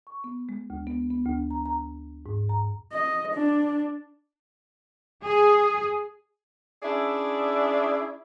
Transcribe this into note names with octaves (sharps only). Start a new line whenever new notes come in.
C#6
B3
G#3
D2
B3
B3
D2
A#5
A#5
G#2
A#5
D#5
D4
G#4
C#4 D4 E4 G#4 D5 E5